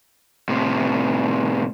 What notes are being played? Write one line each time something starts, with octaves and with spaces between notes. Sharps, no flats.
A2 C3